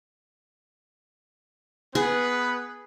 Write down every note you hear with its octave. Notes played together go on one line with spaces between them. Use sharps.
B3 G#4 B4